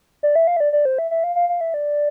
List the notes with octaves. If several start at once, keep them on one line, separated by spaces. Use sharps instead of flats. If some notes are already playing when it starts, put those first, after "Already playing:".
D5
E5
F5
E5
D5
D5
C5
E5
E5
F5
F5
F5
E5
D5